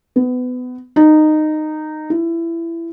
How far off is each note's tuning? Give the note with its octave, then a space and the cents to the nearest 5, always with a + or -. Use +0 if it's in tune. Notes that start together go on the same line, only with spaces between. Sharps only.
B3 +25
D#4 -15
E4 +20